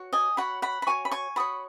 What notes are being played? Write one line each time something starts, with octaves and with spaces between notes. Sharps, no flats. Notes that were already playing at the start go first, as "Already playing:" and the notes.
Already playing: F#4 C#5
D#5 G#5
F#4 C#5 F#5 B5
F#5 B5
B5
F#4 C#5 G#5 C#6
B5
G#5 C#6
F#4 C#5 B5 D#6